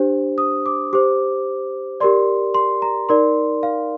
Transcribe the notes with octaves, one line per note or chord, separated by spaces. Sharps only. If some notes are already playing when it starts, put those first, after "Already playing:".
Already playing: D4 G4 C5
D#6
D6
G4 C5 D6
G4 A#4 D5 C6
C6
A#5
D#4 A#4 D5 C6
F5